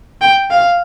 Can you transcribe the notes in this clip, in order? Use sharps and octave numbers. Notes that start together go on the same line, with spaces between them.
G5
F5